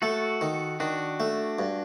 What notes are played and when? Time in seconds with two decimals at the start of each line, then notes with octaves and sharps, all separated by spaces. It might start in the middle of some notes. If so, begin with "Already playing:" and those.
0.02 A3 F#4 A4
0.41 D#3
0.80 D#3 D4 F#4
1.20 A3
1.59 G2